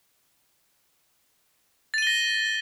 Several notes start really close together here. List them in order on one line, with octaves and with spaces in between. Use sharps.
A6 D#7 G7 A#6